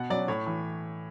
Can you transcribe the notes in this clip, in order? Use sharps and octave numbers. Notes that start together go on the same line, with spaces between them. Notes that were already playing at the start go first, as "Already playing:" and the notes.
Already playing: B2 F#5
F#3 C#4 D5
A2 C#5
E3